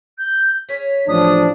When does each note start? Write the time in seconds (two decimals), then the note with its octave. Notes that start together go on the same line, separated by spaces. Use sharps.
0.18 G6
0.69 C#4 G#4 C#5 B6
1.08 A1 F3 D4 D#6